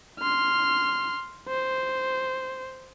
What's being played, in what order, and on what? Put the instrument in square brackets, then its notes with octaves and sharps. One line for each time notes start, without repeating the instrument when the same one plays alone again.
[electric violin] C6 F6
C5